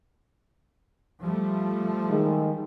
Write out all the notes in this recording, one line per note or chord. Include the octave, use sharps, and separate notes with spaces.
F3 G3 A3
D#3 G#3